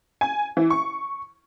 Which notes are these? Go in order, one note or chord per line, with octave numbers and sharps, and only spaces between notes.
G#5
E3
C#6